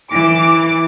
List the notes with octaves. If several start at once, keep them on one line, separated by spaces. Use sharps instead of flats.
E3 D6